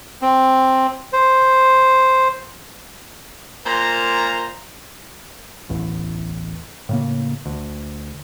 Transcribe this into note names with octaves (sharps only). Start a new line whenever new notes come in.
C4
C5
A#2 A#4 C5 A#5
D1 A1 E2
A2 C#3 A#3
D2